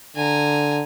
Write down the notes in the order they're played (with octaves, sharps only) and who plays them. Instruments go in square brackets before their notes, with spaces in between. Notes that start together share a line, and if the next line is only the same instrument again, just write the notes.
[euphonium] D3 [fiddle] G#5 A#5